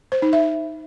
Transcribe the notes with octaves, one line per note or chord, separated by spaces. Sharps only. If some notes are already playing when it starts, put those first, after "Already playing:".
C5
D#4
E5